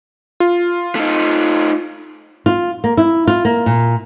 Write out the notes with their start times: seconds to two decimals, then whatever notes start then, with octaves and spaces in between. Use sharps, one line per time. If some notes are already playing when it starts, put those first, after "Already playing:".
0.40 F4
0.95 A3 D#4
2.46 F4
2.84 A#3
2.97 E4
3.27 F4
3.45 A#3
3.66 A#2